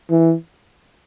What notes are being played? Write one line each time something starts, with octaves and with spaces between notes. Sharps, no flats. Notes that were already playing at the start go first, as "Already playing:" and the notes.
E3